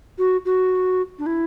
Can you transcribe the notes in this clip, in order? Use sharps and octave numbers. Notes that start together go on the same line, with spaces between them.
F#4
F#4
D4
E4